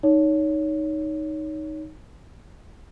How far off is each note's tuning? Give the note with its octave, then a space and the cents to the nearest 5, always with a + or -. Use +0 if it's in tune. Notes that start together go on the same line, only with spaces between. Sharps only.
D#4 +0 C#5 +20